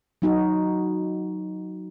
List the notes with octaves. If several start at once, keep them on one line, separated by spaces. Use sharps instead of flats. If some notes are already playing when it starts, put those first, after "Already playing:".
F#3 D#4 F#4